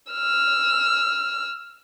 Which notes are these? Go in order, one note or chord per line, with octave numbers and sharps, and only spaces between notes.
E6 F6